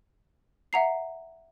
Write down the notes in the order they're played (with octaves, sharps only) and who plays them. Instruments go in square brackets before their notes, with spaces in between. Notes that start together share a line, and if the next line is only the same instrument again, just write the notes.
[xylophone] E5 F#5 A#5 C7